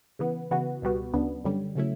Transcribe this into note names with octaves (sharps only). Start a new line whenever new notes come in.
C#3 E3 B3
C#3 E3 B3 F#4
C#2 B2 G3 B3 F#4
D2 C#3 F#3 B3 D4
F#2 D3 G3 C#4
C#3 F#3 A3 C#4 E4